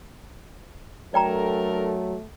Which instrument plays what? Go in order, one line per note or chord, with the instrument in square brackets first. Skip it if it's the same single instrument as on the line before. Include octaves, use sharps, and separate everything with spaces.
[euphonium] F#3 [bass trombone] A3 [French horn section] D4 A4 A#4 [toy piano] D5 G5 A#5